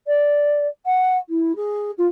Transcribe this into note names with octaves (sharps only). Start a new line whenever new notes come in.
D5
F#5
E4
G#4
F4